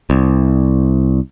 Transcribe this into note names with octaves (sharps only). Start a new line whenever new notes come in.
C2